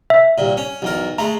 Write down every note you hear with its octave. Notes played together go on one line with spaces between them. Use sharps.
E5
C2 A#2
C#4
B1 E2 A#4
G#3 A3 A#5